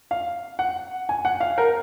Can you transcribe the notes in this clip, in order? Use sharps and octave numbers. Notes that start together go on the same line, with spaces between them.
F5
F#5
G#5
F#5
F5
A#4